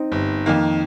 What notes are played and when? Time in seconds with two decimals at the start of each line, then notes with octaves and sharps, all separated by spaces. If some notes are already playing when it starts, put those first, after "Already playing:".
Already playing: C4 D#4
0.12 G1
0.46 F2 D#3 A#3